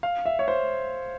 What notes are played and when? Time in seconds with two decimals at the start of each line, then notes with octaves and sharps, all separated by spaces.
0.03 F5
0.26 E5
0.39 C#5
0.48 C5